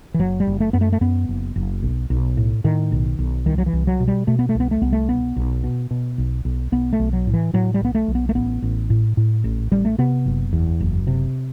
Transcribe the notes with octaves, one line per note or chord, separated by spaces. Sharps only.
E3
F#1 F#3
G3
F#1
A3
F#2 B3
A3
A3
F#2 B3
F#1
F#1
B1
B1
A2
A2 D#3
B1
B1
C2 D#3
F#3
E3
C2
F#3
B2
G3
B2 A3
B3
A3
C2
B3
A3
C2 B3
A3
B1 B3
B1
B2
B2
B1
B1
B1 B3
A3
B1
F#3
A2
E3
A2 F#3
G3
B1 B3
A3
B1
B3
A3
A1 B3
A1
A2
A2
A1
A1 G3
A3
C3 B3
F#1
E2
F#1
C3